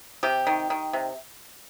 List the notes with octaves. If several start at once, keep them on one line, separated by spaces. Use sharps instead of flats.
C3 G4
D#3
D#3
C3